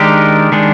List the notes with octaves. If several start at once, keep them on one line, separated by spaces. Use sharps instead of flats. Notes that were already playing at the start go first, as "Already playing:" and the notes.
Already playing: D#3 G#3 D4 G4 A#4
D#3 G#3 D4